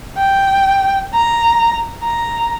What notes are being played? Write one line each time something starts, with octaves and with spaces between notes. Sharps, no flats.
G5
A#5
A#5